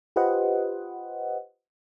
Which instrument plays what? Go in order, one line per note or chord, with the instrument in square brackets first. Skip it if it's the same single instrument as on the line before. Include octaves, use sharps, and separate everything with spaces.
[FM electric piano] F4 G4 B4 C5 D#5 F#5